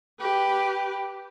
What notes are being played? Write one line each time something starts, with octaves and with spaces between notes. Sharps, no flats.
G4 B4